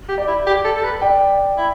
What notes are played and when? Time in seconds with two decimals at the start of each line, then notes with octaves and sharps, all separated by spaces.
0.09 G4
0.18 D5
0.27 E4
0.46 G4
0.65 A4
0.76 A4
0.84 B4
1.01 D5 G5
1.58 E4